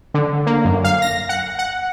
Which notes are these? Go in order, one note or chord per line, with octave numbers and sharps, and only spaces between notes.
D3
A#3
F#2
F5
A#6
F#5
F#5